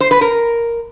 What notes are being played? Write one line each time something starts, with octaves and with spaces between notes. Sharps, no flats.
C5
B4
A#4